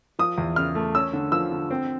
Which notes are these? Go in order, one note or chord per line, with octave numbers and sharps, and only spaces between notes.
F3 D#6
E2
C#3 F6
A3
C#4 E6
D3
F3 E6
D3
C4